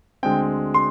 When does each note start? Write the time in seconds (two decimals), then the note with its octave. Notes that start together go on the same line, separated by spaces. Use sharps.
0.23 D2 D3 G#3 C4 G5
0.74 C6